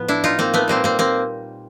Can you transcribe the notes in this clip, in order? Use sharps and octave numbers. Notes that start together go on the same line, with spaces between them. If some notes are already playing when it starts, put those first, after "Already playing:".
Already playing: A2 F3 B3
D4 E4
D#4 F4
A#3 C4
A3 B3
A#2 G3 A#3 C4
A#3 C4
A#3 C4